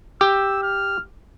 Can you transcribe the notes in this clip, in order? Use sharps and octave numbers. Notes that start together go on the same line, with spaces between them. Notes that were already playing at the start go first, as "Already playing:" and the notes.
G4 E6
F6